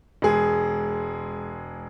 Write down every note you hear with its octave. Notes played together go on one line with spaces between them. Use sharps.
E1 G#3 G#4